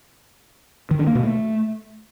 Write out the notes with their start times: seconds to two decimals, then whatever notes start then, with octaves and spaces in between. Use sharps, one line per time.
0.91 D#3
0.99 D4
1.07 A#3
1.15 B2
1.23 A3